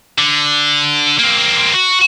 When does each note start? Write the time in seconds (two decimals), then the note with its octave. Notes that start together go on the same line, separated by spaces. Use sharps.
0.18 D3
1.19 A#3 C4
1.73 F#4